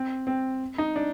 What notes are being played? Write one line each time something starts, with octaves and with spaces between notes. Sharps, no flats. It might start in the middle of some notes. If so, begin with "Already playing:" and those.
Already playing: C4
C4
D#4
D4